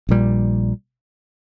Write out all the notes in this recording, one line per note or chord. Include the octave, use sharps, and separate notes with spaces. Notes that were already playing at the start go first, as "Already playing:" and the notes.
A#1 A#2 G3